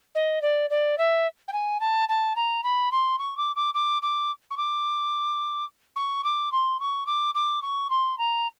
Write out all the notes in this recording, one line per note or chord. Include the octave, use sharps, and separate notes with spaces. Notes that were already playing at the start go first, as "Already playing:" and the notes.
D#5
D5
D5
E5
G5
G#5
A5
A5
A#5
B5
C6
C#6
D6
D6
D6
D6
C#6
D6
C#6
D6
C6
C#6
D6
D6
C#6
C6
A#5